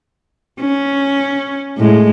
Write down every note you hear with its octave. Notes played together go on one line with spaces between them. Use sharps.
C#4
A2 G#3